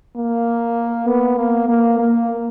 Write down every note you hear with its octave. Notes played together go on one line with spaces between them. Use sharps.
A#3
B3
A#3
A#3
A#3